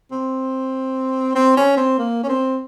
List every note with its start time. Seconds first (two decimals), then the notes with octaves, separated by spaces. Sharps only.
0.11 C4
1.36 C4
1.57 C#4
1.76 C4
1.98 A#3
2.23 C#4
2.29 C4